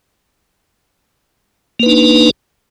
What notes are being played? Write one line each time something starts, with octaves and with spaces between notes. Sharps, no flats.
A#3 D4 D#4 B4